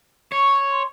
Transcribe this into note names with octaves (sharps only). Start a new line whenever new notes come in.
C#5 C#6
C6